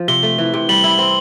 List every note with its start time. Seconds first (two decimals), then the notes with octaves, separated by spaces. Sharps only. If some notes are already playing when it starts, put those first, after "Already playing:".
Already playing: F3
0.08 C3 G7
0.23 A3
0.38 E3
0.54 C3
0.69 G3 F#7
0.84 E4
0.98 C4